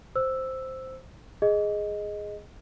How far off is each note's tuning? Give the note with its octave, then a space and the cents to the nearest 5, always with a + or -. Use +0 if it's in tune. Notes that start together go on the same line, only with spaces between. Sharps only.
C5 +0 E6 +0
G#4 +0 D#5 +0